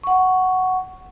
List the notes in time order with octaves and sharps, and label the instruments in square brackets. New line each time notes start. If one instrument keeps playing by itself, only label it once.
[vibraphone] F#5 C#6